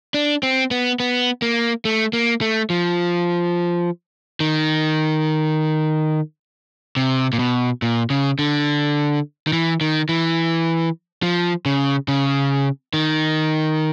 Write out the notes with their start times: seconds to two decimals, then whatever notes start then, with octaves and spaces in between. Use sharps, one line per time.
0.14 D4
0.43 C4
0.71 B3
1.00 B3
1.42 A#3
1.85 A3
2.13 A#3
2.41 A3
2.70 F3
4.40 D#3
6.96 C3
7.33 A#2
7.39 B2
7.82 A#2
8.10 C#3
8.39 D3
9.47 D#3
9.53 E3
9.81 D#3
10.09 E3
11.22 F3
11.66 C#3
12.08 C#3
12.94 D#3